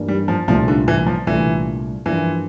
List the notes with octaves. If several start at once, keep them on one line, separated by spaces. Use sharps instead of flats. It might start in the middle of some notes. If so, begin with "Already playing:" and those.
Already playing: G2 E3 A#3 D4
G3
F3
C2 A#2 F3 A3 D4 F4
D3
E3
F3
C2 A#2 E3 A3 D4 F4
G2 E3 F3 A#3 D4 F4